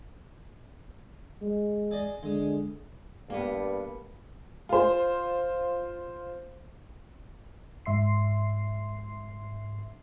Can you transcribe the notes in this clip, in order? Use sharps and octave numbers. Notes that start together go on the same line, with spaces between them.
G#3
G#4 D5 D#5
D3 G#3 D#6
G2 A#3 B3
F4 C5
G#2 E5 C6 C7